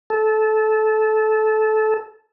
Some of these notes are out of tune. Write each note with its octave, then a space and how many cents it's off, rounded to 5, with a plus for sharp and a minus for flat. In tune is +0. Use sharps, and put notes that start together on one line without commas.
A4 -20